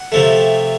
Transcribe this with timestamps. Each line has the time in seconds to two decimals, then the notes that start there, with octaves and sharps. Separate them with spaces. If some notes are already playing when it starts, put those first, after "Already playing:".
Already playing: F#5
0.12 C3 F3 A3